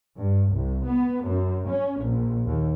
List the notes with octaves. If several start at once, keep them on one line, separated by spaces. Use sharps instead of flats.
G2
C2
B3
F#2
C#4
A#1
D#2